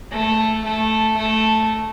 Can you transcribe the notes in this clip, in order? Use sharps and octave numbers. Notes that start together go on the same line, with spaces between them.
A3
A3
A3